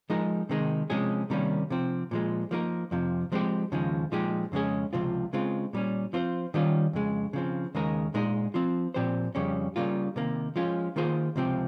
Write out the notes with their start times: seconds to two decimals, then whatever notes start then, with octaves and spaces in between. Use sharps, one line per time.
0.10 F3 G#3 D#4 A#4
0.49 C3 D#3 G#3 D#4
0.90 C3 F3 G#3 C#4 G#4
1.30 C3 D#3 G3 A#3 C#4
1.70 C3 F3 C4
2.11 A#2 F3 G#3
2.51 F3 A#3 D#4 G4 A#4
2.91 F2 C3 F3
3.32 F3 G#3 C4 G4 C5
3.72 D#2 C#3 F3 G#3 D#4
4.12 A#2 F3 G#3 D#4 G4
4.52 F2 C#3 G#3 C#4 G#4
4.93 C#2 C3 F3 C4 F4
5.33 C#3 G#3 C4 F4
5.73 A#2 G3 C#4
6.13 F3 C4 F4 G#4 C5
6.54 D#3 G3 C#4 F4
6.93 F2 C#3 G#3
7.33 C#3 F3 C4
7.75 D#2 C#3 G#3 D#4 A#4
8.14 A#2 G#3 D#4 G#4
8.54 F3 C4 F4
8.94 A#2 F3 C4 G4 C5
9.35 F2 C#3 G3 C#4 G4
9.76 C#3 G3 A#3 F4
10.16 C3 D#3 A#3
10.56 F3 G#3 C#4 F4
10.96 D#3 A#3 F4 G#4 C5
11.36 C#2 C3 F3 C4 G4